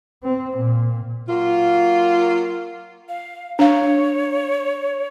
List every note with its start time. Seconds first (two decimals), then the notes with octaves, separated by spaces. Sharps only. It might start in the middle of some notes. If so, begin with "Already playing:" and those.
0.24 C4
0.58 A#2
1.28 F#3 A#3 F4
3.09 F5
3.59 D4 C#5 F5